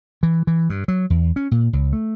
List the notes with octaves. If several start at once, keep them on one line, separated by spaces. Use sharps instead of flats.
E3
E3
G2
F#3
E2
C#4
A#2
C#2
A3